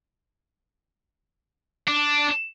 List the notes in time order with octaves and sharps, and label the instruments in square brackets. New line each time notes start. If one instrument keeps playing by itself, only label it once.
[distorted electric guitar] D4